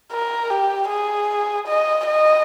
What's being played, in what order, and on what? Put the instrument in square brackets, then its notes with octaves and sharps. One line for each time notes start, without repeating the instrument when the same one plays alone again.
[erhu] A#4
G4
G#4
D#5
D#5